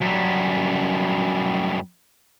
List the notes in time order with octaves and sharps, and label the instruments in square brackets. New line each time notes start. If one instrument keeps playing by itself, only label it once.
[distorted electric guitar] F#2 G3